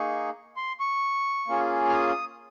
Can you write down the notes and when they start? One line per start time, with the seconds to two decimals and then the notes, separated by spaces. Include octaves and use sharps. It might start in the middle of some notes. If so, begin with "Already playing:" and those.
Already playing: A#3 D#4 G#4 C#6
0.57 C6
0.80 C#6
1.48 A#3 C#4 F4 G#4
1.89 F6
1.93 D#6